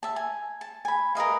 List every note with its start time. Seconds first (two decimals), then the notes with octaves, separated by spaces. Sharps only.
0.03 E5 A5
0.16 G#5
0.61 A5
0.85 G#5 B5
1.15 A#4 B4 D#5 F5